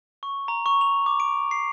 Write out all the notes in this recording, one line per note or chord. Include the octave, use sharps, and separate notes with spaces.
C#6
A#5
C#6
F7
D6
D7
C7